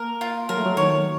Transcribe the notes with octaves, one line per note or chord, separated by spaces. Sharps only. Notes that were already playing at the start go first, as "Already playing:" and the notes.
Already playing: A#3 A#4
F4
F#3 A#4
A3
F#3
D#3 C#5